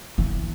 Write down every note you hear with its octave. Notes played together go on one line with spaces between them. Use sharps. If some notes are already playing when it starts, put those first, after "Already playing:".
E3